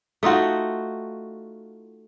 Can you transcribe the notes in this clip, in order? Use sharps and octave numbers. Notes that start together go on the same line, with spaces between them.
A3 D#4 F4 F#4